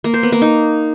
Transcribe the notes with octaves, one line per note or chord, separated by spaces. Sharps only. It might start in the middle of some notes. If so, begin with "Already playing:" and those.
A#3
C5
B3
A#3
D#4